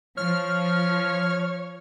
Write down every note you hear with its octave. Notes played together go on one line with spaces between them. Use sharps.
F3 C#5 F6